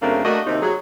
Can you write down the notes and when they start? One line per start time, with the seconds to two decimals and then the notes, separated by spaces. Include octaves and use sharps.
0.02 F#2 C#3 A3 A#3 C4 D4
0.24 A3 A#3 D4 F#4 A#4 D#5
0.46 D#2 C3 D#4
0.62 F#3 G#4